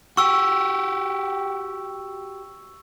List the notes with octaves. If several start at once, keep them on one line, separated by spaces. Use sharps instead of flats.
F#4 G4 C#6 E6